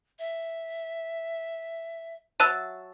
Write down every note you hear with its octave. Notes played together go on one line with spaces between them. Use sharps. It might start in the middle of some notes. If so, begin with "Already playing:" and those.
E5
F#3 E5 A5 E6 F#6 D#7